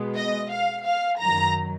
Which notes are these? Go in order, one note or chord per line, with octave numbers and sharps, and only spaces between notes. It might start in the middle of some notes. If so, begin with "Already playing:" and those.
Already playing: B2 G#3 B3
D#5
F5
F5
F#2 D#3 F#3 A#5